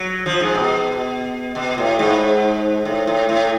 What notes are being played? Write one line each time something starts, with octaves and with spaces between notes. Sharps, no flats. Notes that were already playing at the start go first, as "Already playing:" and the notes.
Already playing: F#3
F3
G#2
B2
B2
A2
G#2
A2
A2
A2